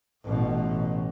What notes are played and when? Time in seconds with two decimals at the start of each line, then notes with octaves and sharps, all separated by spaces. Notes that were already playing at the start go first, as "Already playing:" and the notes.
0.23 A1 B2